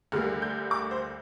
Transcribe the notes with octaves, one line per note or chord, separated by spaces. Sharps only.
D2 D3 G3 A#3 F6
G6
D6
C5